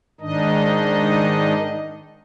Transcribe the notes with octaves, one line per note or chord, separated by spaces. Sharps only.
G#2 D#3 D4 D#4 D#5